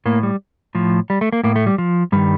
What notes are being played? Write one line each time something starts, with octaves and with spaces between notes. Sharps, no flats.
A2 A#3
G3
A2 F3
G3
A3
A#3
A2 A#3
A3
G3
F3
G2 D#3 G3